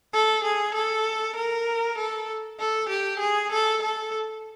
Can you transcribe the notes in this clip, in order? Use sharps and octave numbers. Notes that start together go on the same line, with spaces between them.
A4
G#4
A4
A#4
A4
A4
G4
G#4
A4
A4